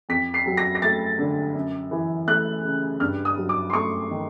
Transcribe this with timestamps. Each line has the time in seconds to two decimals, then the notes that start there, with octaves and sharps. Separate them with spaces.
0.09 F2 B6
0.34 C7
0.46 F#3
0.57 A#6
0.75 A#6
0.82 A3 A6
1.19 D3
1.54 F#2
1.91 E3
2.27 A3 F#6
2.64 C#3
3.00 G2 F6
3.25 D#6
3.37 F#3
3.49 D6
3.70 C6
3.73 A3 C#6
4.11 D#3